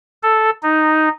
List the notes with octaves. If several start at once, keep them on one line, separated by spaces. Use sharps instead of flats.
A4
D#4